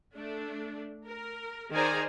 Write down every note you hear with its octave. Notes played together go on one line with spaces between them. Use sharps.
A3 D4
A#4
D#3 G#4 C5 D5 G#5 A#5